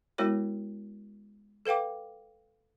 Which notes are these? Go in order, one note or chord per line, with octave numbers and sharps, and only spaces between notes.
G#3 B3 E4 F#4 A#4 C#5
A4 B4 F5 G5 D6